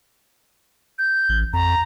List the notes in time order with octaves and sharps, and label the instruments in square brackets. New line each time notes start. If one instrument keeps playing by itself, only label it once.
[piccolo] G6
[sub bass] A1
[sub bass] F2 [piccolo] A#5